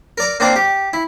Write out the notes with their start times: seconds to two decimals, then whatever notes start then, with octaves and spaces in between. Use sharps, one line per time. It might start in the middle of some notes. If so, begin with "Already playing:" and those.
0.18 A#4 D5 A#5
0.40 A#3 C4 D4 D5
0.56 G4
0.93 E4